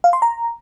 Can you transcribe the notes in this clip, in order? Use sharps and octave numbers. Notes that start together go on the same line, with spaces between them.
F5
C6
A#5